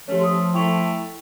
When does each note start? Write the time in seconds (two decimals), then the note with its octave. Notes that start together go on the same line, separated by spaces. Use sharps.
0.08 F3 A3 C#4 G4 C#5
0.20 C6 D#6
0.54 A3 E4 G5 C#6 F7